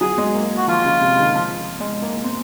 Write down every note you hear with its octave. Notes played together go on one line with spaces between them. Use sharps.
F#3 G#4
G#3
A#3
F#4
F3 F4
C#3
C3
D#3
F3
G#3
A#3
C4